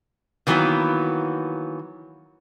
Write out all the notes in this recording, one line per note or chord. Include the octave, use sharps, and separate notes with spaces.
D#3 E3 F#3 A#3 B3